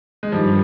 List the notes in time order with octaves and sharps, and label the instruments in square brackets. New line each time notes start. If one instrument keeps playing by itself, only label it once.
[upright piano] G#3
[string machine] G2 D#3 [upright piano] F3 G3